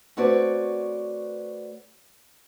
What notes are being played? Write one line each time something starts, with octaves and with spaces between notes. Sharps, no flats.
A3 C4 F#4 B4 C#5 D5